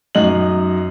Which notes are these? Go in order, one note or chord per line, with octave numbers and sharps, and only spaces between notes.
F#2 D#4 D#5 F#7